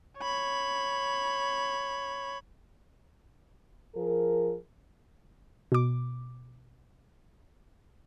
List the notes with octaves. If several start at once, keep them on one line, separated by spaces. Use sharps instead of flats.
C#5 B5
F3 G#4 A#4
B2 D6